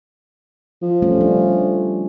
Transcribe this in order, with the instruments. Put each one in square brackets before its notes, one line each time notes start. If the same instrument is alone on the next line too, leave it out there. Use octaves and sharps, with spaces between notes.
[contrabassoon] F3
[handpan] G3 A3 C#4
D4